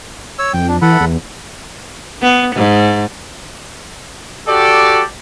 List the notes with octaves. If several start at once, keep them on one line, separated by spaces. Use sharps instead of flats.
C#5 E6
F2 G5
D4
E3 A4 F#5 B5
E2
B3
G#2
F#4 G4 A4 D5